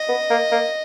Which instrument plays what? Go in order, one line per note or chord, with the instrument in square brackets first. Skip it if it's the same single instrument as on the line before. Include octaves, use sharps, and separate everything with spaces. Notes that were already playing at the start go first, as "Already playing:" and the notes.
Already playing: [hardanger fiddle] D#5
[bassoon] B3
A#3
A#3